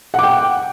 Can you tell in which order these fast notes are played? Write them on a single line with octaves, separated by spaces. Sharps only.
F#5 D6 G5